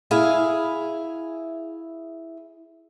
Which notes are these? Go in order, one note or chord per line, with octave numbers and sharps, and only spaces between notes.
E4 G#4 E5 F5